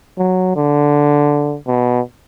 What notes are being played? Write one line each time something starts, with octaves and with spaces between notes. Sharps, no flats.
F#3
D3
B2